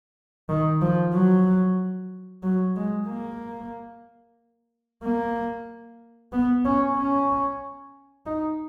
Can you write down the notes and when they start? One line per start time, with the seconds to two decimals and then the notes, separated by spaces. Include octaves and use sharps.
0.49 D#3
0.82 F3
1.14 F#3
2.43 F#3
2.76 G#3
3.08 A#3
5.03 A#3
6.32 B3
6.65 C#4
6.97 C#4
8.26 D#4